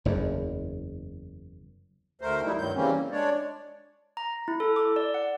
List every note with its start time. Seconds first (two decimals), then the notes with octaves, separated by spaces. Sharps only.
0.05 F#1 E2
2.21 D2 A3 A#4 C5
2.44 F3 G3 A3 D#4 E4
2.58 G2 D#3 F#3 G6
2.75 C#3 E3 G3 A#3 C4 C#4
2.96 A#2
3.11 G#3 D4 C#5 D5
4.17 A#5
4.48 E4
4.60 A4
4.76 D6
4.96 D5
5.14 F#5